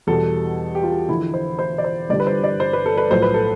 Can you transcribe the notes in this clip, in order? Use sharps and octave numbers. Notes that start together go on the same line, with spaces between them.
E2 B2 G3 A4
G4
F4
E2 D3 F3 E4
C5
C5
D5
C5
G1 G2 D3 G3 D5
B4
C5
D5
C5
B4
A4
B4
B1 A2 F3 C5
B4
A4